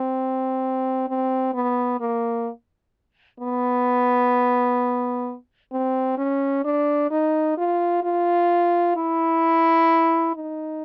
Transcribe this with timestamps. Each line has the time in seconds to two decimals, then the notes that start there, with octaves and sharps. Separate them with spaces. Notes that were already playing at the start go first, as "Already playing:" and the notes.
Already playing: C4
1.08 C4
1.54 B3
2.00 A#3
3.40 B3
5.72 C4
6.17 C#4
6.64 D4
7.10 D#4
7.58 F4
8.03 F4
8.96 E4
10.35 D#4